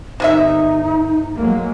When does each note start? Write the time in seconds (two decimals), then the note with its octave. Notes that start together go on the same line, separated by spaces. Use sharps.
0.20 G1 C3 D#3 D#4 E5
1.37 F#3 G#3 A#3